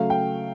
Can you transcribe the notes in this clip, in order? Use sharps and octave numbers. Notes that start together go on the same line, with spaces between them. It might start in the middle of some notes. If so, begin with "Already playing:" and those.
Already playing: C#3 F#3 A3 F5
G5